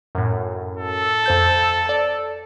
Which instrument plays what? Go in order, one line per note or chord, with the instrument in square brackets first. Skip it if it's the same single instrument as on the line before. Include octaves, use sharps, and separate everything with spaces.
[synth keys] F#2 A2
[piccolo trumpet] A4
[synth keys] F2 C5 G6
D5 A5